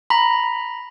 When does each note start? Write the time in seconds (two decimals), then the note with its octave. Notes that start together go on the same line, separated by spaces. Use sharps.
0.10 A#5 B5